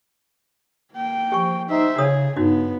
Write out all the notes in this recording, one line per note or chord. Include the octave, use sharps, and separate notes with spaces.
A#3 G5
F3 G4 G#5 C#6
D#4 C5 E5
C#3 F4 G#4 C#5 D#6
G2 B3 D#4 F4 F#4